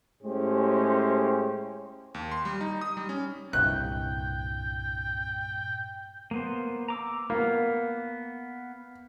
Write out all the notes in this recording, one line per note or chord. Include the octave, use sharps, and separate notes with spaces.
A2 G#3 C#4 G4 C5
D#2
C6
G3
D#4
D#6
G3
C#4
C2 G2 A#2 G5 F#6
A#3 B3 C5
A#5 D6 E6
A#3 B3